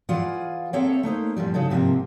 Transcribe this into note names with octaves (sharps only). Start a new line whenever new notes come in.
E3 F4 G#4 D5 F5 F#5
A#3 C4 G#4 A4 C#5 E5
A3 A#3 D#4 C5
A#2 E3 F3 G3
C#3 F#3 D#4 E4 A4
G#2 C3 F3 A3 A#3